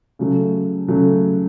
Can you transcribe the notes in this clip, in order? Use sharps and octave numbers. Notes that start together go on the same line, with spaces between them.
C#3 F#3 A3
C#3 F#3 A3